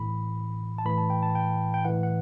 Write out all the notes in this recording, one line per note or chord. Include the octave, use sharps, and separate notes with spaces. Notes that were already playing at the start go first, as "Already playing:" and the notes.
Already playing: A2 E3 B5
A5
A2 E3 B5
A5
G5
A5
G5
G5
A2 E3 F#5
F#5